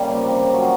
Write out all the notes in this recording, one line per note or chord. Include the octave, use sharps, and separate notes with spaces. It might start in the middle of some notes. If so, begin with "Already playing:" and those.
Already playing: C#3 G3 A#3
F3
C3
C3
F3 F#3